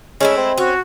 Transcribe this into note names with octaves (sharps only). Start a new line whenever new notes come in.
G#3 A3 C#4 E4
C4
C#4 F#4